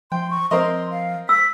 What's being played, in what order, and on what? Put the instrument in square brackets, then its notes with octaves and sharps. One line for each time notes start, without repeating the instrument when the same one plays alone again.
[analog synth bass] F3 [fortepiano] G5 [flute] C6
[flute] C#6
[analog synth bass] F3 [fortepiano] C4 A#4 D#5 [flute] C6
[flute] F5
[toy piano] E6 [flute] B6